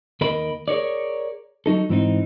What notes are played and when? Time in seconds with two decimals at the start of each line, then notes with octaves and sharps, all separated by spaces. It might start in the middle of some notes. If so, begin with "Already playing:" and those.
0.21 D#2 A#4 D#5 B5
0.68 G#4 A#4 C#5 D5
1.66 F#3 D#4 A4
1.89 G#2 E3 C4 D4 D#4